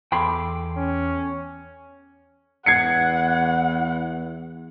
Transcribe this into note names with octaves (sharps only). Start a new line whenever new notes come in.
E2 A4 G5 B5 C6 D6
C#4
E2 F#5 G#6 C7 C#7